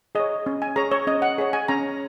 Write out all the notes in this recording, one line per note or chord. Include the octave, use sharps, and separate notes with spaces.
G#4 C#5 D#5
C#4
G#5
G#4 C#5 A#5
C#5
C#4 D#5
F#5
G#4 C#5
G#5
C#4 A#5